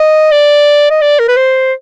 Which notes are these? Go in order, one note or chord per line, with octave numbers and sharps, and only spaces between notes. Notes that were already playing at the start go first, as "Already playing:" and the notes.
Already playing: D#5
D5
D#5
D5
A#4
B4
C5